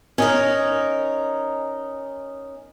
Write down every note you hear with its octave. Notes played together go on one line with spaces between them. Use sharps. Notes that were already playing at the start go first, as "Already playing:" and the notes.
C#4 D#4 A#4